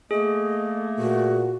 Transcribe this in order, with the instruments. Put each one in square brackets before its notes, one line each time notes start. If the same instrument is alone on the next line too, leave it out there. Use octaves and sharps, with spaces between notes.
[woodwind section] A3 A#3 [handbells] G#4 [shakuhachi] D#5
[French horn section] A#2 [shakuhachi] F#4